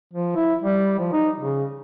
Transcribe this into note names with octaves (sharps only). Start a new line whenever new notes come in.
F3
E4
G3
F3
D#4
C#3